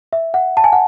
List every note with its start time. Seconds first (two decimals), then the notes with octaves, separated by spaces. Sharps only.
0.13 E5
0.34 F#5
0.57 A5
0.64 G#5
0.73 F#5